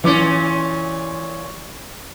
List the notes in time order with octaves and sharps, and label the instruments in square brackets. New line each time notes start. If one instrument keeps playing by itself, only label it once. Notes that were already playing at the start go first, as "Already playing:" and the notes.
[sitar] A#2 C#4 [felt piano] E3 D6